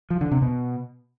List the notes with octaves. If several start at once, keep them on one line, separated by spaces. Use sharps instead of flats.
F3
D3
C3
B2